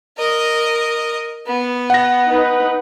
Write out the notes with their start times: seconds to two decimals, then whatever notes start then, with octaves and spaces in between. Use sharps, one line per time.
0.17 A#4 D#5
1.47 B3
1.90 F#5 A#6
2.29 D#4 B4